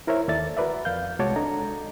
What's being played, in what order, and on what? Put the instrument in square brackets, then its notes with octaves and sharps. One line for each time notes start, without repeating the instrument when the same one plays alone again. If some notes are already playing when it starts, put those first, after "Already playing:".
[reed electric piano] E4 A#4 C5 C#5 E5
D#2 A4 D5 E5 A6
F#4 A#4 B4 D5 E5
F2 F5 G6
C2 G#3 F#4 C#5 A5 D6
D4 A4 D#5 A#5